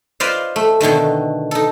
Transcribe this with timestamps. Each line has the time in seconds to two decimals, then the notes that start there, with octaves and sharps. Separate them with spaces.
0.20 F4 B4 C5 D5 D#5 F5
0.56 A3
0.80 B2 D3 D#3 A3
1.51 D#4 A4